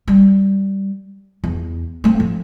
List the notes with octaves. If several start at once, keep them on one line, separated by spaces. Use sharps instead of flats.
G3
E2
A3 C4
F3